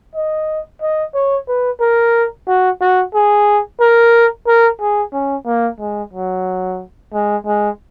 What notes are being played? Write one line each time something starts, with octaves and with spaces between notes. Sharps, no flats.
D#5
D#5
C#5
B4
A#4
F#4
F#4
G#4
A#4
A#4
G#4
C#4
A#3
G#3
F#3
G#3
G#3